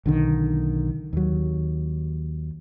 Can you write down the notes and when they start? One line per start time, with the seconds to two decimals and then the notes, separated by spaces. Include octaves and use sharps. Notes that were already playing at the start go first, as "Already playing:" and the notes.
0.06 B1 D3 D#3
1.13 D#2 F#3